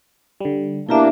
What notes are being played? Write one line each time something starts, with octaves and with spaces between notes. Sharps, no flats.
D3 G3
B2 A#3 D4 E4 G4 A#4 E5 D6